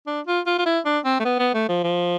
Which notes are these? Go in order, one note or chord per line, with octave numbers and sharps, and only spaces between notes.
D4
F4
F4
F4
E4
D4
C4
A3
B3
B3
A3
F3
F3